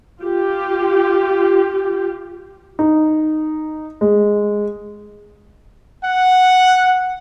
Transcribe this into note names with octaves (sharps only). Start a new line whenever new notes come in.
F4 G4
D#4
G#3
F#5